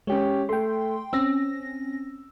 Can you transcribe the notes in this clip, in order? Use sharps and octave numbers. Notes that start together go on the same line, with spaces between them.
G#3 C#4 G4 C#5
A3 G5 C6
C4 C#4 E6 A#6